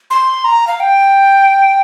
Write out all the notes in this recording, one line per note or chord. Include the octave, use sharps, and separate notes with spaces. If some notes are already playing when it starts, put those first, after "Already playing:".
C6
A#5
F5
G5